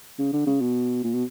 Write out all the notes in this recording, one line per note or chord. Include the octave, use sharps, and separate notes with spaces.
C#3
D3
C#3
B2
A#2
B2